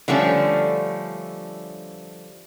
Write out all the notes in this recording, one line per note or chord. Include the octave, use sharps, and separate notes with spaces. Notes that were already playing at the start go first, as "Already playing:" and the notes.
D3 F3 G3 A3 C#4